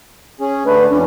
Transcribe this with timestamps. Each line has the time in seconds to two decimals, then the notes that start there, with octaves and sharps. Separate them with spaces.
0.40 C#4 G#4
0.65 D3 A3 D4 B4
0.90 F2 C#4 D4